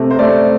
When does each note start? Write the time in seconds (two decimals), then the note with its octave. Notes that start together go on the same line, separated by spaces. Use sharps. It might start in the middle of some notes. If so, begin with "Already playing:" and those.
Already playing: C3 A3
0.11 C5
0.19 A3 D5